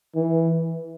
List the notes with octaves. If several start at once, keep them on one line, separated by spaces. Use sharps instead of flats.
E3